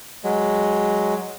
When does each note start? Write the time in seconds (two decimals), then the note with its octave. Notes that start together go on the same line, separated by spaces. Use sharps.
0.24 F#3 G#3